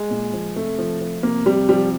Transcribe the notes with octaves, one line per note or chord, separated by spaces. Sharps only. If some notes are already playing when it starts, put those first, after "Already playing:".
Already playing: G#3
A#2
F3
C3 A3
F3
F3
C3 A#3
C3 G3
F3 G3